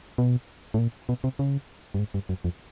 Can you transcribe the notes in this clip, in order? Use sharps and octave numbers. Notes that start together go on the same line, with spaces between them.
B2
A2
A#2
B2
C3
C#3
G2
G#2
G2
F#2
F2